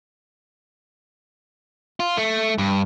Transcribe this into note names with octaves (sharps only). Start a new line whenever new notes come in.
F4
A3
G2